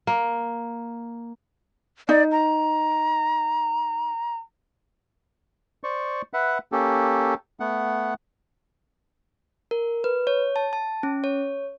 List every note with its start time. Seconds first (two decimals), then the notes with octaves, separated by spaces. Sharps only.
0.07 A#3
2.09 D#4 D5
2.32 A#5
5.84 C5 D5 C#6
6.33 B4 E5 F#5
6.72 A#3 C#4 G4 A4
7.60 A3 B3 F#5
9.71 A#4
10.04 B4
10.27 C#5
10.56 A5
10.73 A5
11.03 C#4
11.24 C#5